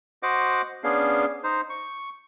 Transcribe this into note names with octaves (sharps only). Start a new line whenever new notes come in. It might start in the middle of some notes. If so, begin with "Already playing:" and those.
F#4 C5 D#5 F#5 D6
B3 C#4 D4 G#4 F5
D#4 C5
C#6